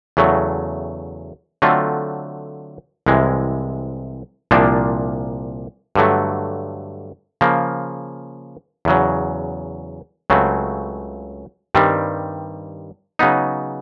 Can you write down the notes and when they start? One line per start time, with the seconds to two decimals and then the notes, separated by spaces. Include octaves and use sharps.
0.17 E2 C#3 F#3 A3
1.62 D3 F#3 A3 C4 F4
3.06 C2 C3 E3 G#3
4.51 C2 A#2 F3 A#3 D4
5.96 G2 D3 F#3 A3
7.41 C#3 F3 A#3
8.85 E2 C#3 F#3
10.30 C#2 C#3 F#3 A3 C4
11.75 G2 D#3 G3 C4
13.19 C#3 F#3 B3 D#4